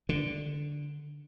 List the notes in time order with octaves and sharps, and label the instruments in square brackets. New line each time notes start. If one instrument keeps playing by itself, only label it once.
[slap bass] D3